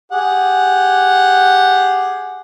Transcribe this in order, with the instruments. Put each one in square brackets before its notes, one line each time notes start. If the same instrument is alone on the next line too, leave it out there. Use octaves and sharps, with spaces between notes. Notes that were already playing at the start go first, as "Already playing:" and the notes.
[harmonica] G4 G#4 F#5